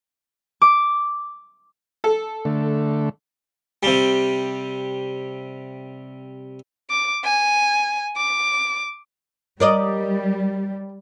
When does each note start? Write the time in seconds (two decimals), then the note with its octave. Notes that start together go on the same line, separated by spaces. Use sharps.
0.62 D6
2.04 A4
2.45 D3 A3
3.83 C3 G3
6.90 D6
7.24 G#5
8.17 D6
9.60 G3 A#4 D5 D#5